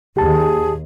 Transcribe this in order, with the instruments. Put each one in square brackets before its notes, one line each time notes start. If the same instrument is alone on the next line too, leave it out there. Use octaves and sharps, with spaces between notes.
[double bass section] D#2 [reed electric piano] G4 A5 [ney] G#4